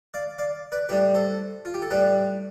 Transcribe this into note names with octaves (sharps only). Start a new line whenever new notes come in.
D5 F5
D5 F5
B4 D5
A2 G3 D4 G4 B4
A4 C5
F4
G4
A4
A2 G3 D4 G4 B4